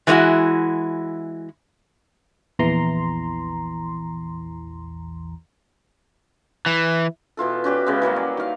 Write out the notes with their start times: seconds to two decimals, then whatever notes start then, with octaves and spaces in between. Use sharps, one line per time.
0.07 E3 G#3 C4 D#4 E4 F#4
2.59 A#1 E2 E3 A#5 C6
6.66 E3
7.37 B2 E3 F4 A4
7.64 C#4 F#4 G4 D5
7.86 C#3 G#3 B3
8.02 E3 F#3 G3 A#3
8.16 D5
8.37 D#3 F5